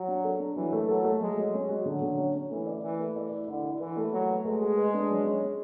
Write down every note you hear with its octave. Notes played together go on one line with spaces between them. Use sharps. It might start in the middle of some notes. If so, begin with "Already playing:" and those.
Already playing: F#3
D4
A4
D4
E3 F#3
A3
F#3 A4
A3
F#3 G#3
F#3
G#3 C#4
F#4
D3 F#3
D3
C#4
C#4
E3 A3
D5
E3 B4
A3
D5
E4
D3 E4
E4
E3 B4
A3
F#3 A3
B4
G#3 A3
G#4
B4
D4
F#3
C#4
G#4